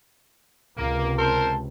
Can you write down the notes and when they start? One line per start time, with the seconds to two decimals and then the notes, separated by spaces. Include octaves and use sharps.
0.78 C#2 C3 A#3
1.18 A#4 C5 A5